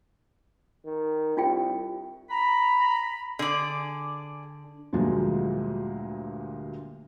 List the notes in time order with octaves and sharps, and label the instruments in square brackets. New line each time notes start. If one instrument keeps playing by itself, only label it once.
[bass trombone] D#3
[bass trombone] C2 [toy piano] D4 F4 G5
[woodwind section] A#5 B5
[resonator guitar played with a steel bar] D3 [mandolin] G#4 D5
[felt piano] D2 G2 A#2 F3 F#3 G#3